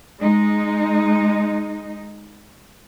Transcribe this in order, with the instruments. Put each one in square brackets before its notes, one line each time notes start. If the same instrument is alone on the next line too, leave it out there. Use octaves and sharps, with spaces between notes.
[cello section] G#3 D#4